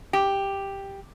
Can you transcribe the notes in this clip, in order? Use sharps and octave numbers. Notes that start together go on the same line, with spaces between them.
G4